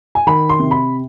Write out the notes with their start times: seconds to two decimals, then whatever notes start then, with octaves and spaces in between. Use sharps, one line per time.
0.15 G#5
0.27 D#3 B5
0.49 C6
0.59 C3
0.71 B5